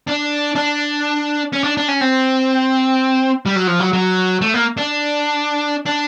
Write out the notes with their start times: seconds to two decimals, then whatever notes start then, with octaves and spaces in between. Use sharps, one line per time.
0.08 D4
0.56 D4
1.53 C#4
1.64 D4
1.77 D4
1.89 C#4
2.01 C4
3.46 G3
3.56 F#3
3.67 F3
3.80 F#3
3.93 F#3
4.41 A3
4.54 A#3
4.78 D4
5.86 D4